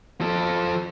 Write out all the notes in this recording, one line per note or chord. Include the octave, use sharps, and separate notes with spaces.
F3 A4